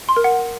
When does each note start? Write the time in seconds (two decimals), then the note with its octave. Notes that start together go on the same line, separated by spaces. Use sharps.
0.09 C6
0.17 A#4
0.24 F#5